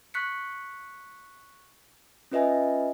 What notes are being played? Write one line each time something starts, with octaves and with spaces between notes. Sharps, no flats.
C#6 F#6 B6 C#7
C#4 F4 B4 D#5 E5 G#5